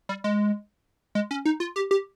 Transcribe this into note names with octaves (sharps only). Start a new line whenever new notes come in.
G3
G#3
G#3
C#4
D#4
F4
G4
G4